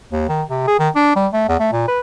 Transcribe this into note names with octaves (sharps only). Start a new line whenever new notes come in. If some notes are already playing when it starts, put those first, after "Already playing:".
D#2
D#3
C3
G#4
D#3
D4
G3
A3
E2
A3
A#2
B4